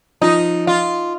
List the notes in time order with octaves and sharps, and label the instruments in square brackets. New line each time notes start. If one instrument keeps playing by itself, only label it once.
[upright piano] F3 [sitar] D#4
[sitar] F4